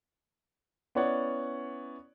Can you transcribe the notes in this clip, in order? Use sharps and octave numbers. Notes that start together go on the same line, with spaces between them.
B3 C#4 E4 C#5 D5 F#5